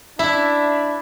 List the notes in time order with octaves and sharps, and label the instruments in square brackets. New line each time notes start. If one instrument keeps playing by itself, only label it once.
[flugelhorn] D4 [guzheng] E4 [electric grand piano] E5